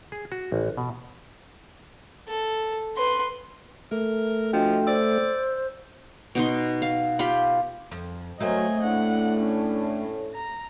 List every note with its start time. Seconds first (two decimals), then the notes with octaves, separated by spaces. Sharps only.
0.12 G#4
0.32 F#4
0.52 A1
0.77 B2
2.29 A4
2.97 B4 C6
3.91 A3 A#4
4.53 F3 D4 F#4 D#5 G5
4.87 C5 D5 E6
6.35 B2 D#4 C6
6.82 F5
7.19 F4 G4 G5 B5
7.91 F2
8.40 F#3 A3 A#3 C4 D#5 G#5
8.83 A2 D4 F#5
9.41 C#4
10.35 A#5